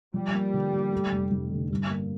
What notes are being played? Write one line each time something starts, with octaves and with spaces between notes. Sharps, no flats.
F3 G3
A#3
D3
A#3
A3
F1
F1
D3
G2
A#3